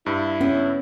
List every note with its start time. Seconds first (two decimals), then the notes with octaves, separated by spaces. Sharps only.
0.06 G2 E4
0.41 B3 C#4